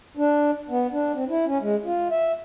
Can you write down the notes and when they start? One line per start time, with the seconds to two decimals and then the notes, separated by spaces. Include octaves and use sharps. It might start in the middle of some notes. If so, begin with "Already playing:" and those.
0.17 D4
0.70 B3
0.92 D4
1.14 C4
1.30 E4
1.46 C#4
1.61 G#3
1.85 F4
2.11 E5